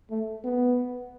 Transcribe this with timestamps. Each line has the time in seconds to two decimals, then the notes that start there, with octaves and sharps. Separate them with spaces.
0.11 A3
0.44 B3